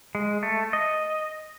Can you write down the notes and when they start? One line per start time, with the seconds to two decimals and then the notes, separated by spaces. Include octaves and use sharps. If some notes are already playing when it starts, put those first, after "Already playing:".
0.15 G#3
0.43 A3
0.73 D#5